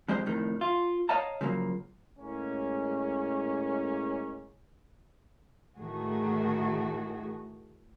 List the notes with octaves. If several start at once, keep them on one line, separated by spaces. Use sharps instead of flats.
F2 G#3 G4 C5
F2 A2 D#3
F4
C#5 D#5 F5 A5 A#5
C#3 F3 F#3 A#3
A2 G#3 A#3 C#4
A2 D#3 A3 F#4 G#4